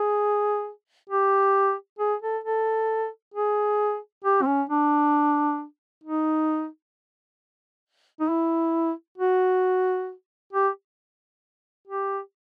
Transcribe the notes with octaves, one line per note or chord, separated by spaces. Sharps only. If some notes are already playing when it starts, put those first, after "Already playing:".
Already playing: G#4
G4
G#4
A4
A4
G#4
G4
C4
C#4
D4
D#4
D#4
E4
F#4
G4
G4